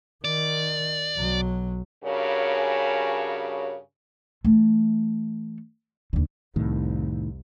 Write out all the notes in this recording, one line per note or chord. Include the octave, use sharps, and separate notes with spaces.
D#3 D5
B1 F#3
G2 C#3 F#4 G#4 A#4 C#5
E3 A3
D#2 D3
C2 F2 A2 D#3